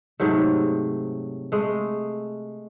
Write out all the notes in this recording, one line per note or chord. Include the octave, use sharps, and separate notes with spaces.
G#2 C3 F#3 A3
G#3 A3